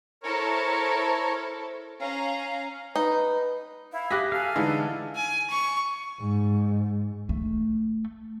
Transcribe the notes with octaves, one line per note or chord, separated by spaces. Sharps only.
E4 A4 A#4 C5 C#5
C#4 F5 A#5
D#4 B4
E4 F5 G#6
G4 G#4 F#6 A#6 B6
A4 F5 G#5
D3 E3 G#3 D#4
G#5
C#6
G#2
A3